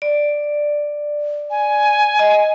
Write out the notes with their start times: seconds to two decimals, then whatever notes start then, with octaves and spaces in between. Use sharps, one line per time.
0.02 D5
1.50 G#5
2.19 D#5